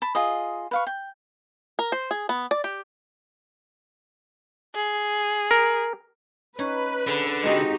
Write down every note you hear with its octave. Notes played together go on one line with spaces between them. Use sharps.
A5 B5
F4 G#4 D#5
B4 F5 C#6
G5
A#4
C5
G#4
B3
D5
G4
G#4
A#4
C#4 D#4 B4 C#5
D3 G#4
G#3 C4 D#4 F#4 G4 G#5